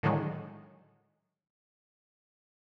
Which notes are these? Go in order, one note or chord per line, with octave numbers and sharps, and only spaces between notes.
A2 D3 D#3 F#3 G#3